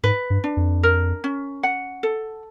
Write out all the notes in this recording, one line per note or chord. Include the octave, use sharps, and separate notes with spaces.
G#2 B4
G2
D4
F2
A#4
C#4
F#5
A4